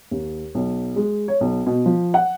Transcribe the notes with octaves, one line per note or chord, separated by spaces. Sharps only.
D#2
B1
G#3
C#5
B1
B2
F3
F#5